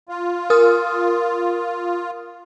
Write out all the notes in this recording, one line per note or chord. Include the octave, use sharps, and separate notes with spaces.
F4
A#4 D#6 F6